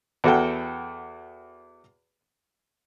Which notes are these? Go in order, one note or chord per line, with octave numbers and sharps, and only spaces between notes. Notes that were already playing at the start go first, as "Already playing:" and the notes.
E2 F#4 A4 G5